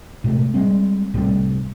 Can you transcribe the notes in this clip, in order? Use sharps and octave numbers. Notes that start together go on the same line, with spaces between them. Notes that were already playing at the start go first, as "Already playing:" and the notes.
A2 C3 G#3 A3
G3 G#3 C4
C2 A2 C3 G3